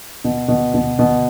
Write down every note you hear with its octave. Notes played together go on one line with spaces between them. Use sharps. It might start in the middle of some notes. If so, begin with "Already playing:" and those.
B2
B2
B2
B2